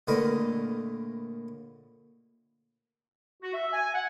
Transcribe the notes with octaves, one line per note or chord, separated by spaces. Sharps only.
A#1 A2 D3 A#4 B4 D#5
F#4
E5
G#5
F#5